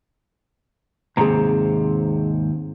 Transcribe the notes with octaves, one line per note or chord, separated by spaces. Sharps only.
D#2 G#2 C3 G#4 A#5